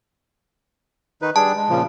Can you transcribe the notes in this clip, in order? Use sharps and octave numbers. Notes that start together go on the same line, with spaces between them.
D#3 D#4 B4
G3 D4 G#4 A5
G#3
A#2 C#3 F3